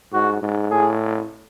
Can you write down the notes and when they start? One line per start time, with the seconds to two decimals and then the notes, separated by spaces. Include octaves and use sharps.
0.13 G#2 F#4
0.42 G#2
0.71 A2 G#4